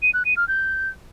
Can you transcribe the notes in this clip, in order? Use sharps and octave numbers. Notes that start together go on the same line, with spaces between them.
D#7
F#6
D#7
F6
G6